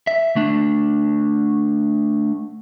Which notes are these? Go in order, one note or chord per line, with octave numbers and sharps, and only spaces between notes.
E5
A3 D4